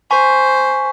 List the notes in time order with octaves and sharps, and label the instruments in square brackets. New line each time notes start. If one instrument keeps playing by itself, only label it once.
[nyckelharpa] C5 [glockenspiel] G#5 C#6 B6